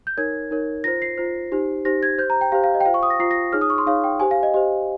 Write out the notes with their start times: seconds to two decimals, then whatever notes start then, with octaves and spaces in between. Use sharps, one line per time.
0.07 G6
0.18 D#4 A#4 C#5 G#6
0.51 D#4 A#4 C#5
0.84 F4 C5 A#6
1.02 C7
1.18 F4 C5
1.52 D#4 G4 C5
1.85 D#4 G4 C5 A#6
2.03 G#6
2.18 G4 C5 G6
2.30 A#5
2.41 G5
2.52 G4 C5 F5
2.64 F5
2.74 D#5
2.81 G5
2.85 F4 C5 F5
2.94 C#6
3.03 D#6
3.10 A#6
3.20 F4 C5 C7
3.31 A#6
3.53 D#4 G#4 C#5 F6
3.61 D#6
3.70 C#6
3.78 C6
3.86 D#4 G#4 C#5 F5
4.04 G5
4.20 G4 C5 G#5
4.31 F5
4.43 D#5
4.54 G4 C5 D#5